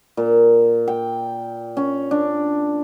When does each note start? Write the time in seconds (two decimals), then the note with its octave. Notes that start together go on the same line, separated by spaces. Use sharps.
0.17 A#2
0.88 G5
1.77 C#4
2.11 D4